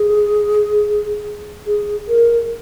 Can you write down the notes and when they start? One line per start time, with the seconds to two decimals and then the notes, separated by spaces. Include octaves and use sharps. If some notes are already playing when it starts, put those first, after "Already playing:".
Already playing: G#4
1.66 G#4
2.09 A#4